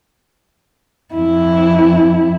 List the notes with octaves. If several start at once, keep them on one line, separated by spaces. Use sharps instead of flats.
F2 E4